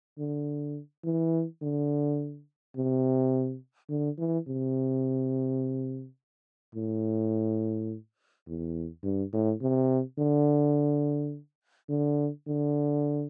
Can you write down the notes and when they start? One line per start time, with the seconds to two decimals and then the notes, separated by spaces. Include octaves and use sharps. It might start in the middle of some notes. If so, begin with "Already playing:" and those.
0.19 D3
1.04 E3
1.62 D3
2.76 C3
3.89 D3
4.18 E3
4.47 C3
6.75 A2
8.47 E2
9.04 G2
9.33 A2
9.61 C3
10.18 D3
11.89 D3
12.47 D3